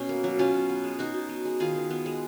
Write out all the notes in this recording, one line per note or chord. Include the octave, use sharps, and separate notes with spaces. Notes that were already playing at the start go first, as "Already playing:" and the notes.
Already playing: B2 C#4
A#3
F#3
B2 C#4 F4
B2
B3
G#3
B2 D#4 F#4
B2
B3
G#3
D#3 F4 G#4
D#3
B3
G#3